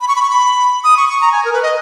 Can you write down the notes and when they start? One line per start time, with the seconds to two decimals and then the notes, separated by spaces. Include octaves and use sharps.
0.01 B5
0.08 C#6
0.16 B5
0.22 C#6
0.30 B5
0.84 D#6
0.97 C#6
1.09 C#6
1.21 A#5
1.32 G#5
1.45 A#4
1.53 B4
1.63 D#5